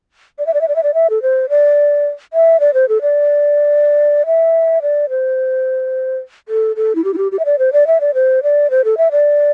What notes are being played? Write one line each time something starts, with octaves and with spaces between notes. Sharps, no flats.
D5
E5
D5
E5
D5
E5
D5
E5
A4
C5
D5
E5
D5
C5
A4
D5
E5
D5
C5
A4
A4
E4
G4
E4
G4
G4
E5
D5
C5
D5
E5
D5
C5
D5
C5
A4
E5
D5